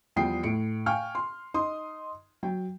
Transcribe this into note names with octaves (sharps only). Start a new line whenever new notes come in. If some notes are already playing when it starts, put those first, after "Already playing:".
E2 F3 G3 G5 D#6 C7
A2 C#7 D7
F5 G5 G#5 C#6 F6
C6
D#4 C6 D#6
F#3 G5